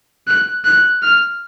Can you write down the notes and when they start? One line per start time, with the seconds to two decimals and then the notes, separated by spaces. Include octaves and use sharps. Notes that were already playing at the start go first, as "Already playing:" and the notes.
0.27 F#6
0.64 F#6
1.02 F6